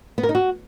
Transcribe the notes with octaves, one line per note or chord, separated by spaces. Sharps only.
B3
A#4
D#4
F#4